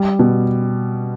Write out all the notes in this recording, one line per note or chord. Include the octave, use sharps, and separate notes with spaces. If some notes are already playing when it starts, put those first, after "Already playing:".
Already playing: G3
B2